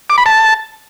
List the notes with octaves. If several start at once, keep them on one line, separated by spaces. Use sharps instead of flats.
D6
B5
A5